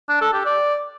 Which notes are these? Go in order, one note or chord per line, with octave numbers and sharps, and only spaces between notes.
D4
A4
G4
D5